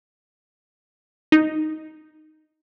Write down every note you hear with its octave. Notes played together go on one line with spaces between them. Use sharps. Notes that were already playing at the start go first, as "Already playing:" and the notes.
D#4